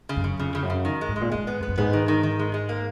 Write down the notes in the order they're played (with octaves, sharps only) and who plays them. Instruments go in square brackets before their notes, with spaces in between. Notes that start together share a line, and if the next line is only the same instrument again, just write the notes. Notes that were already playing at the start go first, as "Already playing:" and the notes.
[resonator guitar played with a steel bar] C#3
[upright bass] F#2
[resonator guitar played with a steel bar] C#3
[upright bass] F2 [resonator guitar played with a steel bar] C#3
[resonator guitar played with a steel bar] C#3
[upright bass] F#2
[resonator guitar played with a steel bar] C#3
D#3
G#3
[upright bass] G#2
[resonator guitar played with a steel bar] G#3
[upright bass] A#2
[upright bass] G#2 [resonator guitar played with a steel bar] G#3
[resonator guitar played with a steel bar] B3
[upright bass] F2 [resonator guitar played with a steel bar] B3
[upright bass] F#2
[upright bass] G#2 [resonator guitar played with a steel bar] B3
[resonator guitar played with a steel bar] D#3
D#3
D#3
G#3
G#3
A#3